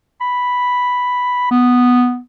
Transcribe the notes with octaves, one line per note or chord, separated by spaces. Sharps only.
B5
B3